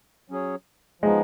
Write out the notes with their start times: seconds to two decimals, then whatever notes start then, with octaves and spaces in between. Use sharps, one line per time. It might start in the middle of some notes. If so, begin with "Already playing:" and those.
0.30 F#3 C#4 G#4 C#5
1.02 F3 G#3 B3 D#4